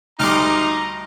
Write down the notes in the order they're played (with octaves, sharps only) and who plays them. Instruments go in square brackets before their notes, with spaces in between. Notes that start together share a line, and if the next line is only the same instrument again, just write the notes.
[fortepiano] D2 G3 [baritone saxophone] D#4 [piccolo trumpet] A#5 [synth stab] C6 D6 F6